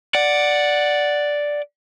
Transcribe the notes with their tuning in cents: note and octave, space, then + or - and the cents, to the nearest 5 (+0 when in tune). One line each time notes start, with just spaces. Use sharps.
D5 +0 F#5 +0